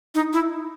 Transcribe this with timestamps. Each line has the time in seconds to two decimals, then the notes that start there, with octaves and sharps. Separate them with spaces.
0.15 D#4
0.33 E4